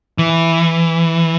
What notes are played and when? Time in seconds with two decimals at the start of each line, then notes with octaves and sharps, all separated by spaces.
0.18 E3